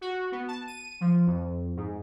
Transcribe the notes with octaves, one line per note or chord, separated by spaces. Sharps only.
F#4
B3
A5
D#7
F3
F2
G#2